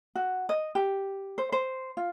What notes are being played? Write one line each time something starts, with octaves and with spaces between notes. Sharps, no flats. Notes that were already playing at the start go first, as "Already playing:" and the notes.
F#4
D#5
G4
C5
C5
F4